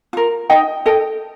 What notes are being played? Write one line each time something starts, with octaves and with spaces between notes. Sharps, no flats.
F4 A#4
D#4 D#5 G5
A4 D#5 G5